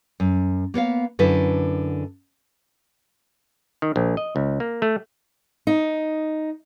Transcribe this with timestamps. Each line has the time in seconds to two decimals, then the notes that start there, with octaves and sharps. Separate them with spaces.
0.20 F#2
0.74 A#3 B3 C#5 F5
1.19 F#2 D3 E4 B4
3.82 D#3
3.96 A#1
4.17 D#5
4.36 C#2
4.60 A#3
4.82 A3
5.67 D#4